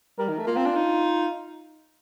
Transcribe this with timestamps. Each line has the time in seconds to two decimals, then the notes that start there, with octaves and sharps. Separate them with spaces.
0.18 G3 A#4
0.29 D#3
0.38 A3
0.47 A#3 F4
0.56 C4
0.66 D4
0.76 D#4